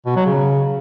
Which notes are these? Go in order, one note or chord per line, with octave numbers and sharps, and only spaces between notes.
B2
F#3
C#3